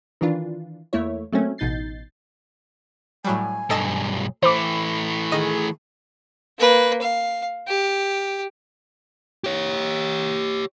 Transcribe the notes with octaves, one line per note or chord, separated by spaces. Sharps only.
D#3 E3 D4 F4
E2 A3 A#3 E4 C#5
F#3 A3 A#3 C4 C#4
A1 B2 D#4 G6 A6 C7
A2 F#3 G3 G#5
B1 G2 A4 D#5 A5
E3 A3 C5 B5 D6
D#3 G#4 D#5 D#7
A#3 B4
F5
G4
G4 C#5